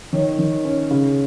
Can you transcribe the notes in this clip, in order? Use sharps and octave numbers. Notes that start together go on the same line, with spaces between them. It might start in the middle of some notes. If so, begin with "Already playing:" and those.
D#3 C#5
D#3
C#4
C#3